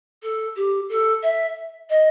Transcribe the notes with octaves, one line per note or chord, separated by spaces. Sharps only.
A4
G4
A4
E5
D#5